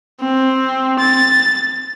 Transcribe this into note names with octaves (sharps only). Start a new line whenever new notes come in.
C4
A6